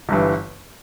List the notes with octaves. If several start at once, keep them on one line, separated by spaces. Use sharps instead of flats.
G1 G2 E3